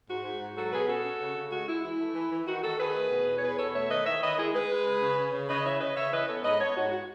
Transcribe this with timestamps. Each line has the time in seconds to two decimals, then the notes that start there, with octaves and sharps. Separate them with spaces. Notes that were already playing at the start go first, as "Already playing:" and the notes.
0.09 G#2 F#4
0.25 G#2
0.41 G#2
0.56 F#3 F#4 A4
0.73 B2 G#4 B4
0.89 C#4 F#4 A4
1.05 C#4
1.21 C#3
1.36 C#3
1.52 G#3 F#4
1.68 G#3 E4
1.84 E3 E4
2.01 A3
2.16 E3
2.32 E3
2.48 D#3 F#4
2.64 D#3 F#4 A4
2.80 D#3 G#4 B4
2.95 A3
3.11 B2
3.27 E2
3.38 C#5
3.43 B3 G#4 B4
3.58 B2 A4 C#5
3.75 A3 C#5 E5
3.91 D#3 B4 D#5
4.06 D#3 C#5 E5
4.22 D#3 B4 D#5
4.38 G#3 E4 G#4
4.54 G#3 G#4 B4
4.70 G#3
4.86 C#3
5.01 C#3
5.18 C#4
5.33 C#3
5.49 C#3 B4 D#5
5.65 E3 C#5 E5
5.81 C#3 B4 D#5
5.97 C#3 C#5 E5
6.13 E3 B4 D#5
6.28 B3 A4 C#5
6.44 G#2 B4 D#5
6.60 B3 A4 C#5
6.77 G#2 F#4
6.92 F#4